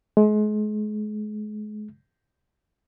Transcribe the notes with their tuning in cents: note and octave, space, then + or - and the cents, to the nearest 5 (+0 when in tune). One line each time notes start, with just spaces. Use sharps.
G#3 +35